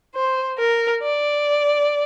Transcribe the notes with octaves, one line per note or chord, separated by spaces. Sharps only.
C5
A#4
D5